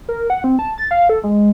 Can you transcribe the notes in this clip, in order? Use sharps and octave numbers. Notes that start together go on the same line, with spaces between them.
A#4
F#5
C4
A5
A6
F5
A4
G#3